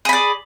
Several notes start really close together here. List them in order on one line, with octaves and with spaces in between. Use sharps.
G#4 B5 D5